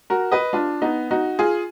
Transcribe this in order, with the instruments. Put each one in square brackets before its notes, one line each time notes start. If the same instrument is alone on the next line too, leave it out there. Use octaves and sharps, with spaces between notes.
[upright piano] F#4 A#4
B4 D#5
D4 F4
B3 D#4
D#4 F#4
F4 G#4